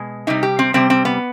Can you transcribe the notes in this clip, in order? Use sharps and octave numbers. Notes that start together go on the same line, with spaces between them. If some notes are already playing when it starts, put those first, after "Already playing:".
Already playing: B2 G#3
C3 G3 D#4
G4
C4
C3 G3 C4
C4
B3